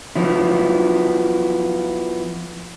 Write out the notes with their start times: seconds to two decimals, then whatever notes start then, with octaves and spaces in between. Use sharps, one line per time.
0.15 F3 F#3 B3 E4